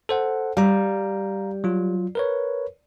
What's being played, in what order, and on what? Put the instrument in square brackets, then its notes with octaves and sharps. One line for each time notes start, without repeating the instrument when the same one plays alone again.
[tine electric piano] A4 C5 F#5
[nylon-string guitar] G3 [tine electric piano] F5 A#5
[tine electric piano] F#3 F4
A#4 B4 C#5